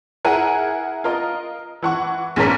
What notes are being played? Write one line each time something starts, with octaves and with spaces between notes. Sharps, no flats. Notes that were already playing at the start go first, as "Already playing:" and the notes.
E4 G#4 A#4 F#5 G#5
F4 A#4 D#5
E3 F#5 C#6
A#1 G#2 D#3 C#4 A#4 B6